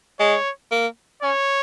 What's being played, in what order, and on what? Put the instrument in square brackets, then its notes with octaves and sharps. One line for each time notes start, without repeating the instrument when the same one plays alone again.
[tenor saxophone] G#3 [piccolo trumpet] C#5
[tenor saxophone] A#3
[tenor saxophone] C#4 [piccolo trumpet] C#5